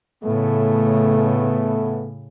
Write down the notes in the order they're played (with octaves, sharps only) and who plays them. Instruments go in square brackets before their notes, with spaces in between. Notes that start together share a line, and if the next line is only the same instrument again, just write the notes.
[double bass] A2 C#3 [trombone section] A3 B3